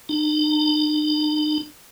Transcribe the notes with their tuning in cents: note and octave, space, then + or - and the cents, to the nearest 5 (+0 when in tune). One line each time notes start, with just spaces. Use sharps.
D#4 -45